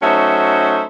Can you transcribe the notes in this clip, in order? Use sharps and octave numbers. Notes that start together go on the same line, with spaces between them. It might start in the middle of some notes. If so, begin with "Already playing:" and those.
F#3 A3 C#4 D#4 C5 E5